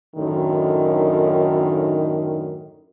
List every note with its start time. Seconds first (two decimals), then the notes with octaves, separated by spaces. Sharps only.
0.16 F#2 A2 D3 D#3